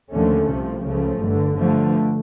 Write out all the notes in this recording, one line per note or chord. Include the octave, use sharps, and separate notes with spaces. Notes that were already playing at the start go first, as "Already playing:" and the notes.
D#2 D3 F3 A3 C#4
C2 C3 F3
C#2 C#3 F3 A3
G1 G2 D3
G2 D3 F3 A3